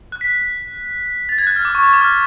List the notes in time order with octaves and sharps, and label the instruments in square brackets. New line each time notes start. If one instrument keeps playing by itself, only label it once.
[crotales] F#6
B6
A6
G#6
F#6
F6
D6
C#6
D6
D6
F6